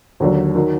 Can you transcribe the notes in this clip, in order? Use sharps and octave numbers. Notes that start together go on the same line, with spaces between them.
D#2 D3 F#3
D#3 F#3